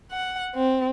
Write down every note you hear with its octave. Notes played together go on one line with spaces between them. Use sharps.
F#5
C4